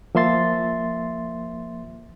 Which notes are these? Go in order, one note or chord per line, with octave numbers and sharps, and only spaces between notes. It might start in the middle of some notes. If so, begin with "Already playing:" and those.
F3 A#3 E5 C6 A6